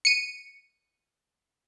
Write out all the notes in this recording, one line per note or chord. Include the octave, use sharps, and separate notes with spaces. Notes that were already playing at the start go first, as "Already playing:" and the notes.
C#7 D#7